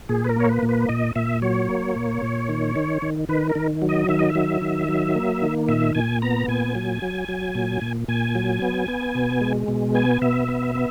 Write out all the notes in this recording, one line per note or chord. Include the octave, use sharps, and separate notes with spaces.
A#2 G#4
B4
A#4
A#3 C#5
B4
A#2
B4
A#2 D#5
A#2 E5
F#3 C#5
A#3
A#2
A#2
D#3
D#3
D#3
D#3 B4
A#4
D#3
F#3
D#5
D#3 E5
D#5
E5
F#3
D#3
F#3
A#3
D#3
A#2 E5
A#2 G#5
B3 A#5
A#2 G#5
F#3
F#3
F#3
A#2
A#2
A#2 G#5
F#3
B3
B3
B2
G#3
B2
B3 G#5
B2 E5
B3
B3